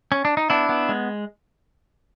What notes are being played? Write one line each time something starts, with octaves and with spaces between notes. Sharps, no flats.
C#4
D4
D#4
B3 D4 E4
B3
G#3